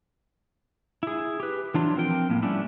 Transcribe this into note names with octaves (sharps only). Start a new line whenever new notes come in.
E4 G#4
G4 B4
E3 F#3 D4 F4
F3 C4 A#4 G5
A2 A#3
G3 A3 C#4 D4 E4